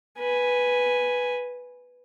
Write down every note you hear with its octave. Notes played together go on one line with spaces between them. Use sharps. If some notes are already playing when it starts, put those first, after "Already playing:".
B4 G#5